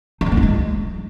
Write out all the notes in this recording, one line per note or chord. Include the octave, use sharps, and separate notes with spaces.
D#4
C4
A#3
E4
G#3